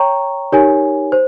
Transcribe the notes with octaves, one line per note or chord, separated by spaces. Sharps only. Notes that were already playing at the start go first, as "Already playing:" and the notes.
Already playing: C#5 G5 A#5 C#6
D#4 G4 A#4 C#5 G#5
C5